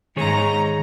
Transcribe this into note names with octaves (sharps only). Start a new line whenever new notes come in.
G#2 D#3 D#4 G#4 C#5 A#5